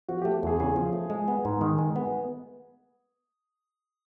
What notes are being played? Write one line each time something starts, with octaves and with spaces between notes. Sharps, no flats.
F3 F#4
A3 G4
E2 G#4
C#3 G#4
F3
A3
G#3
B3
G#2
D#3
G#3
B3